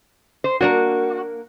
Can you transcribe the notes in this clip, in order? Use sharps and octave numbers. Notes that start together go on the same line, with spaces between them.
C5
A#3 D4 F#4 A#4